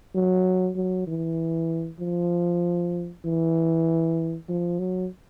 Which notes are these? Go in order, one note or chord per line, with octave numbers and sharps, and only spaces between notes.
F#3
F#3
E3
F3
E3
F3
F#3